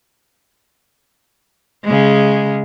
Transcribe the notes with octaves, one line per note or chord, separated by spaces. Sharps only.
C#3 G#3